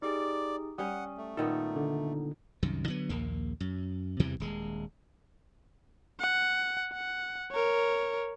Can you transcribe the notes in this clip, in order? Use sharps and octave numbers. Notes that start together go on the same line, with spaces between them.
D#4 G4 G#4 D5
G3 C#4 F#5 D#6
A3
A#2 D#3 B3 D#4
D3
C2 F#2 D#3
D3 F#3 B3
A#1 D#2 A#3
F#2
E2 C3 E3 G3
D#1 G#3
F#5
F#5
A#4 C#5